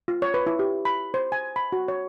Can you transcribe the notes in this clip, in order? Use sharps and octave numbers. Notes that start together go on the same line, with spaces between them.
F4
C#5
B4
E4
G4
B5
C5
G#5
B5
F#4
C#5